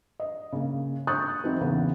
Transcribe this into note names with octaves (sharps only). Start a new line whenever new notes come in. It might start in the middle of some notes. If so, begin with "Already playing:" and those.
D#5
C#3 A#3
C#6 D#6 F#6 G6 A6
E3 F#3 C4 D#4
E2 C#3 E3 B3